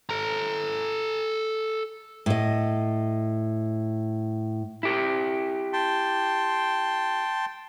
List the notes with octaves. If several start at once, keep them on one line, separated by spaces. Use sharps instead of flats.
A4 A#5
A2 D#5
E4 G4
G5 A5 C6